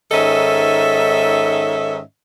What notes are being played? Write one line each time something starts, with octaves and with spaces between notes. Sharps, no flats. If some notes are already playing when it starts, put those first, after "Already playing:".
G#2 D#3 C#4 A4 D#5 E5